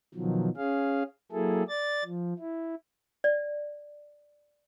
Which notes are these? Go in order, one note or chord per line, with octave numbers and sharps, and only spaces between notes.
B2 D#3 F3 F#3
C#4 G#4 F5
F#3 A#3 E4 G#4 A4
D5 A6
F3
E4
D5